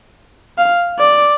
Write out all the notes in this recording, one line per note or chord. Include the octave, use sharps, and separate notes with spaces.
F5
D5